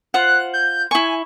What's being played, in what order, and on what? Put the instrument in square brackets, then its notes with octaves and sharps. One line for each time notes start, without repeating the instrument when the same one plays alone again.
[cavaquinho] F4 C5 F#5 [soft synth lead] F#6
[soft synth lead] G6
[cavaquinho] E4 C#6 [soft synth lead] G#5